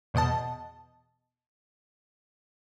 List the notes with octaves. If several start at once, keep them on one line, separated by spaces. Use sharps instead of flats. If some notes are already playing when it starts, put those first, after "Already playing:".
E2 B2 D#5 A5